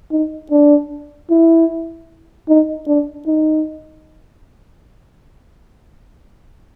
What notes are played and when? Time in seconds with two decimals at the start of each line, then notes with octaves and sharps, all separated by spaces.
0.12 D#4
0.52 D4
1.30 E4
2.49 D#4
2.87 D4
3.27 D#4